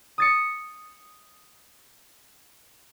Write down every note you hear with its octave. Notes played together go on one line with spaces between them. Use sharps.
D#6 A6 C#7